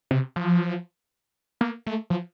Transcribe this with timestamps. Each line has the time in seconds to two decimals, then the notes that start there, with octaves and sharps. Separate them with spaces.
0.11 C3
0.36 F3
1.61 A#3
1.86 A3
2.10 F3